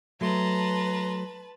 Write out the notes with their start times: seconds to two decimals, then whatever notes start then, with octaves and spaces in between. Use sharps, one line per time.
0.21 F#3 A3 B4 A5 A#5 C6